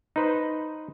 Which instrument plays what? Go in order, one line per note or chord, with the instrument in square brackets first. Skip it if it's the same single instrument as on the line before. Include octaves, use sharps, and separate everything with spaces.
[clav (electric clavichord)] D#4 B4 C5